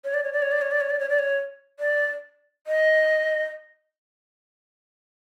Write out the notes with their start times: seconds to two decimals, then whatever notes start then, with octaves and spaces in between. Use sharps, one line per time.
0.05 C#5
0.14 D5
0.24 C#5
0.33 D5
0.42 C#5
0.52 D5
0.62 C#5
0.71 D5
0.81 C#5
0.90 D5
0.99 C#5
1.09 D5
1.19 C#5
1.80 D5
2.67 D#5